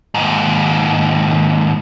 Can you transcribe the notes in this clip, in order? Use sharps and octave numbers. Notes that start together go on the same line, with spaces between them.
D#2 G#2